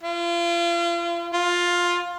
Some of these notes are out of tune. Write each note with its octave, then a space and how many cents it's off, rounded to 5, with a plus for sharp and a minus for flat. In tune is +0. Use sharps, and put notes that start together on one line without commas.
F4 -35
F4 +10